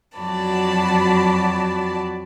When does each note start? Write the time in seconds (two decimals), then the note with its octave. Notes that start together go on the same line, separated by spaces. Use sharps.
0.18 F2 F#3 F#4 D5 A5 B5